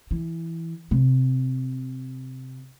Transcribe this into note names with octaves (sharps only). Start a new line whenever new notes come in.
E3
C3